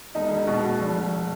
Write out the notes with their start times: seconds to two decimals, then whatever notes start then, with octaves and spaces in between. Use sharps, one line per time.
0.15 E1 D#4
0.31 E1
0.47 B2
0.64 B2
0.80 F1
0.96 F1